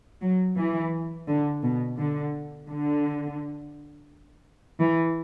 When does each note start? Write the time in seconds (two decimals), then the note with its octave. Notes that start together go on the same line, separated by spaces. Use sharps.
0.22 F#3
0.57 E3
1.27 D3
1.63 B2
1.98 D3
2.69 D3
4.81 E3